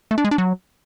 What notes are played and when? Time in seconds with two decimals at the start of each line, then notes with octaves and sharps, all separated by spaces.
0.11 A3
0.18 D4
0.25 G#3
0.31 D4
0.38 F#3